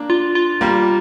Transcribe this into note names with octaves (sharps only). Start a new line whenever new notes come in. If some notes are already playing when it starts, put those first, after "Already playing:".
Already playing: A#3 D4
F4
F4
G3 A#3